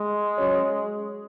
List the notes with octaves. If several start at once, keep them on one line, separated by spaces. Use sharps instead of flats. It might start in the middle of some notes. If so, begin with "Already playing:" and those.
Already playing: G#3
F#3 C#4 F#4 C#5